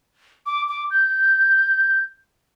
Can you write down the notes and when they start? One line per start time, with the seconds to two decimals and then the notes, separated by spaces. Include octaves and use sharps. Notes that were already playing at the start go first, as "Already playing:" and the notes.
0.46 D6
0.68 D6
0.91 G6